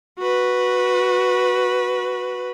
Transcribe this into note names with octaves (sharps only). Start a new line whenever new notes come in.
F#4 B4